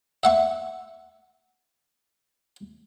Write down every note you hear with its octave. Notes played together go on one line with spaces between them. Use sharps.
E5 F#5 C#6